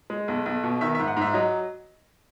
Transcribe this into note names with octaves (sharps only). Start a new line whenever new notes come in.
G#3
B1
B1
B2
D#3 E5
E5
G#2
F#5
G#2 E5
F#3 D#5